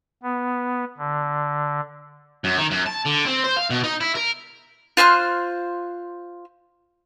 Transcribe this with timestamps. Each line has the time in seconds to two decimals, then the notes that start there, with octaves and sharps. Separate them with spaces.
0.23 B3
0.98 D3
2.44 F#2
2.57 D#3
2.70 F#2
2.86 A5
3.05 D3
3.26 C4
3.44 C5
3.57 F5
3.70 B2
3.84 D#4
4.00 E4
4.15 A#4
4.97 F4 C5 F6 F#6